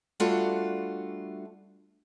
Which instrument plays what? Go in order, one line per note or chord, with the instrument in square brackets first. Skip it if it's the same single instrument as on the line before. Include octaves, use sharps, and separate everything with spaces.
[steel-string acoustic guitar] G3 A3 D4 F4 F#4 A4